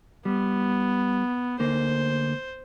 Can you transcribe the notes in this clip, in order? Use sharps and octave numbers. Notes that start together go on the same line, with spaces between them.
G3 B3
D2 A#3 C5